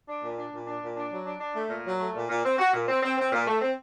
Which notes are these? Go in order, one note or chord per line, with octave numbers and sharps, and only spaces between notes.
D4
A#2
D4
A#2
D4
A#2
D4
F#3
D4
D4
A3
A#2
F#3
A3
A#2
A#2
C4
F#4
A#2
C4
C4
C4
A#2
A3
C4